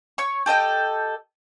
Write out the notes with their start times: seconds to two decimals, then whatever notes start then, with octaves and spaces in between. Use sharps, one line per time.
0.18 C#5 C#6
0.46 G4 A4 D#5 G5